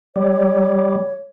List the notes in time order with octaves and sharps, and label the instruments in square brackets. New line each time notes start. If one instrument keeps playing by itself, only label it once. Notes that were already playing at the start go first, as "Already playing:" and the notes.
[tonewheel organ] G3 [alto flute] C#5